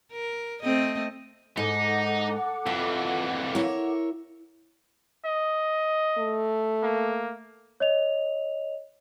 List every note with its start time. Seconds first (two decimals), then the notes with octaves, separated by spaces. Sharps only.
0.12 A#4
0.62 A3 C4 D#5
1.57 G#2 D#4 A4 F#5 D6
2.66 F2 E3 F4
3.55 E4 A#4 C#5
5.25 D#5
6.18 A3
6.83 A#3
7.80 C#5 D#5 F7